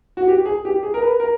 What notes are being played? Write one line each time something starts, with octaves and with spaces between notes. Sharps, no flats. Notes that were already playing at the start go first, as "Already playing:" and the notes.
F#4
G4
G#4
G4
G#4
A#4
B4
A#4